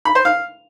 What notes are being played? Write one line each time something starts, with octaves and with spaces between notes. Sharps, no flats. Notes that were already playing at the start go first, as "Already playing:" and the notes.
B5
C5
F5